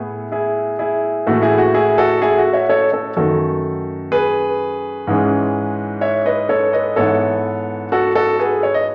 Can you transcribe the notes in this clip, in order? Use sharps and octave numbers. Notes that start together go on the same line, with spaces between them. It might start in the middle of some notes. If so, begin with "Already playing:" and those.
Already playing: A2 B3 E4 G#4
E4 G#4
E4 G#4
A2 E3 A3 F#4 A4
E4 G#4
F#4
E4 G#4
F#4 A4
E4 G#4
F#4
C#5 E5
A4 C#5
A4 C#5
F#2 D#3 A3 F#4 A4
G#4 B4
G#2 E3 G#3 C#4
C#5 E5
B4 D#5
A4 C#5
B4 D#5
G#2 E3 B3 E4 A4 C#5
F#4 A4
F#4 A4
G#4 B4
C#5
D#5